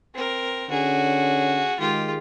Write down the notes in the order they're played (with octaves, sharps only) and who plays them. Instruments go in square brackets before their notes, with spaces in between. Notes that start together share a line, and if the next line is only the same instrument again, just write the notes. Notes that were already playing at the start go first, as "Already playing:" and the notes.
[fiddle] C4 A#4
[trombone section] D3 C#4 [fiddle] F#4 G#4
[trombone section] D#3 G#3 [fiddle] F4 G4